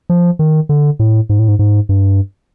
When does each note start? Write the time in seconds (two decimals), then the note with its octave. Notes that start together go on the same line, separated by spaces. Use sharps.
0.10 F3
0.39 D#3
0.69 D3
0.99 A2
1.29 G#2
1.39 A2
1.48 G#2
1.59 G#2
1.89 G2